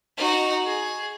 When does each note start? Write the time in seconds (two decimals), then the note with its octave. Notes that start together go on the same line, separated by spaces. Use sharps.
0.17 D#4 F#4
0.66 G#4